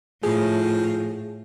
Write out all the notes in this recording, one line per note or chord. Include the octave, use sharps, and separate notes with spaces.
A2 F3 G#4